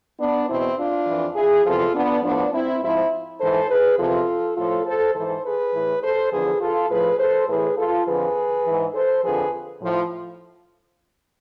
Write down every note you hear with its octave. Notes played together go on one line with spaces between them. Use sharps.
B3 D4
E2 B2 C4 E4
D4 F4
F2 E3
E4 G#4
E2 C3 F3 F4 A4
B3 D4
A2 F3 B3 D4
C4 E4
G#2 F3 C4 E4
G#2 E3 A4 C5
G#4 B4
E2 C3 F3 F4 A4
A2 F3 F4 A4
A4 C5
G#2 E3 A4 C5
G#4 B4
A2 E3
A4 C5
E2 D3 F3 G#4 B4
F4 A4
A2 F3 G#4 B4
A4 C5
A2 E3 G#4 B4
F4 A4
F2 D3 F3 G#4 B4
G#2 E3
A4 C5
F2 D3 F3 G#4 B4
A2 F3